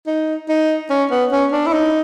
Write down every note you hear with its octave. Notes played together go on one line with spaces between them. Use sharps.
D#4
D#4
C#4
B3
C#4
D4
E4
D#4